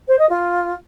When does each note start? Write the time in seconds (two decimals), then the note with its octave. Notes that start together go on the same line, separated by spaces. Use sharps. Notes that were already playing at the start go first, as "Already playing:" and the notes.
0.08 C5
0.18 D#5
0.29 F4